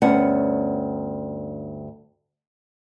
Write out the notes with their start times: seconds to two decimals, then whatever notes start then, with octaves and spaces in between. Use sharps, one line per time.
0.02 D2 G2 B3 C#4 F#5